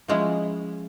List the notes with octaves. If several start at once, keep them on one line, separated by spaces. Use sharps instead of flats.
F3 G#3 C#4 E4